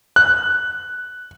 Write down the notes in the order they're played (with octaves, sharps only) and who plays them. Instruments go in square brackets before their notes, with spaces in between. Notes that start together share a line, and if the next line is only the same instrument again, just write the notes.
[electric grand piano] F#6